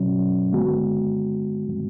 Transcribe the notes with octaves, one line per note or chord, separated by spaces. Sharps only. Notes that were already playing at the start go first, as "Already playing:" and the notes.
Already playing: B2 F#3 C#4
D3 G#3 B3 F#4